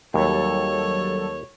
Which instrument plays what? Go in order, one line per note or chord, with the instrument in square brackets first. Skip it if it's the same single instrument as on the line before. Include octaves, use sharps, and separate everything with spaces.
[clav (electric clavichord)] D#2 [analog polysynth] F#3 G3 A4 [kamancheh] C#5